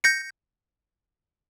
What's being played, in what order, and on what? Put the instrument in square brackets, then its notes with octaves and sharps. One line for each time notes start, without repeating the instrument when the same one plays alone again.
[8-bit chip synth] G6 A#6 C#7